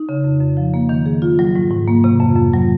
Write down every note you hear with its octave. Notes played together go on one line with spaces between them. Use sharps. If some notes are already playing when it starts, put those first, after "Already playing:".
Already playing: D#4
C#3
F2
F2
F3
A#3
D#3
G#4
F4
F#3
G#2
G#2
A#3
C3
F2
F2
F#3